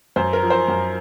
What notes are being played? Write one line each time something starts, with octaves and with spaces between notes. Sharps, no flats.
F#2 C5
A#4
F3
C5
F#2